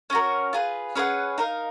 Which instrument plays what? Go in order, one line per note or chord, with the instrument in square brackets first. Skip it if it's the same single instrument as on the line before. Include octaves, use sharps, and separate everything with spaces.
[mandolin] C#4 F#4 A#4
F4 G#4 B4
C#4 G#4 B4 F#5
D#4 A#4 F5